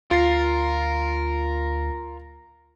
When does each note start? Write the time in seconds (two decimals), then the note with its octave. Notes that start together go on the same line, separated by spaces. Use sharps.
0.11 D2 F4 A#4 A6 C7